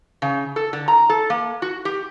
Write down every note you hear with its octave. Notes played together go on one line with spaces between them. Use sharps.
C#3
A4
D3
A#5
A4
A#3
F#4
G4